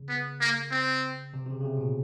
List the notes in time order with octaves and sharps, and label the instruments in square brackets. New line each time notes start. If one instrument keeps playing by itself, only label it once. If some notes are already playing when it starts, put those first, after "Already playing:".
Already playing: [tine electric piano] C#3
[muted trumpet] B3
A#3
C4
[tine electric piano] C3
C3
C#3
C#3
C3
A#2
B2